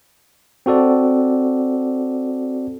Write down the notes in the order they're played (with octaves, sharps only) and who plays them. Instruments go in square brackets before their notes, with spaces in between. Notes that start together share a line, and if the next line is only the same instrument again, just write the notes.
[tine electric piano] C4 F#4 A4 D5